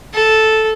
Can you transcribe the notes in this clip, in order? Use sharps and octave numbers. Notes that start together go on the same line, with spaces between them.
A4